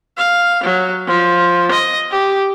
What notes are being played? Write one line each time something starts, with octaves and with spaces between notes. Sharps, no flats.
F5
F#3
F3
D#5
G4